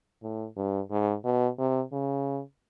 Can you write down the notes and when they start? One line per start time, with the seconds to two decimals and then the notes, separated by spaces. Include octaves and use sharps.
0.23 A2
0.57 G2
0.91 G#2
1.25 B2
1.58 C3
1.93 C#3